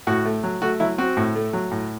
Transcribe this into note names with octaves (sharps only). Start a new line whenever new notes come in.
A2 F#4
A3
F#3
A3 F#4
F#3 E4
C4 F#4
A2
A3
F#3
A2